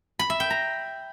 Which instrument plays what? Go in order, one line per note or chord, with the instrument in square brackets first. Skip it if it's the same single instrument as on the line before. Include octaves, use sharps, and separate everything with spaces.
[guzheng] B5
E5
G5
A#5